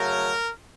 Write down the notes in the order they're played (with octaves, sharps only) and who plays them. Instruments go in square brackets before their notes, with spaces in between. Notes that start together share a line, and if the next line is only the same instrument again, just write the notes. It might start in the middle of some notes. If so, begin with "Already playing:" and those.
Already playing: [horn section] F#2 C#3 F#3 A3 A#4